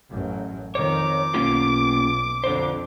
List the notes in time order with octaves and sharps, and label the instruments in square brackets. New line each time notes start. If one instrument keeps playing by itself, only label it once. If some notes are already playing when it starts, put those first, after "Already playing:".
[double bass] A1 F#2
[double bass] F2 D#3 [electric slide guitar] C#5 [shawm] D6
[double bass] B1 [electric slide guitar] A#3 C#4 F4
[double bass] F2 [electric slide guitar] D3 C5